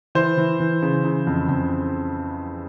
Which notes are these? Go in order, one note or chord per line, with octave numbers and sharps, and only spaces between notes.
E3 C5
E3
E3
C#3
C#3
F2
F2